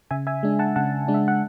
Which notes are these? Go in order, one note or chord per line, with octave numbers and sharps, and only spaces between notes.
C#3 E5 G#5
E5 G#5
G#3 D4
F#5 A5
C#3 F#5 A5
G#3 D4
E5
F#5